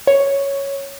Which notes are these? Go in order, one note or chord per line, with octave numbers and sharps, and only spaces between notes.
C#5